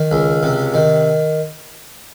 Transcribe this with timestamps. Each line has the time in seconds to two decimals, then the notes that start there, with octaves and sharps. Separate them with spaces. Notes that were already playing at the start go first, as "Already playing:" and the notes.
Already playing: D#3
0.11 C#2
0.43 C3
0.74 D#3